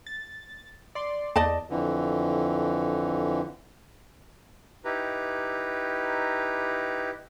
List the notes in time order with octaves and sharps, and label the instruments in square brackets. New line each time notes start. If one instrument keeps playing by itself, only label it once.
[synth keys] A6
D5 C6
[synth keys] E2 [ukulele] D5 D#5 A5
[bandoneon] F2 D3 E3
[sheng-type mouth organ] D#4 E4 G4 B4 A#5